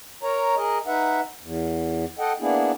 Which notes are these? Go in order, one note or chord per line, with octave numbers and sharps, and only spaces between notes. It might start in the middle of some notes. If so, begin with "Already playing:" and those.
A#4 C#5 A#5
G#4 A#4 D#5
D#4 B4 E5 F#5
E2
A4 D#5 F#5 G5
A#3 B3 D4 E4 G#4